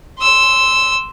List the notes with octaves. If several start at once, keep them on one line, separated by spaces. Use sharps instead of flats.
C6 E6